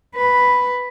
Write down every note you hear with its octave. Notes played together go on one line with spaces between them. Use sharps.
B4